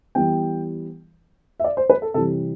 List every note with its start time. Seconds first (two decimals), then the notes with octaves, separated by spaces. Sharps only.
0.15 E3 G3 B3 G5
1.60 E5
1.64 D5
1.77 C5
1.90 B4
2.02 A4
2.14 C3 E3 G3 A4